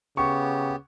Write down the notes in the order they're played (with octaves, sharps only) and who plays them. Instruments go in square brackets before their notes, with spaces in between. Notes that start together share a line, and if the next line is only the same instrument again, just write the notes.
[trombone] C#3 [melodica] B3 G4 [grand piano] C#6